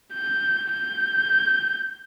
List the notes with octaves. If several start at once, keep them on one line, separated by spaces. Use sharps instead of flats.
G6
G6